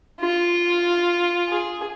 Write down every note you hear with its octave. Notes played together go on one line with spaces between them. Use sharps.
F4
G#4